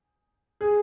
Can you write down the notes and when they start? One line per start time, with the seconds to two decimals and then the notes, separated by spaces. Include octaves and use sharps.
0.61 G#4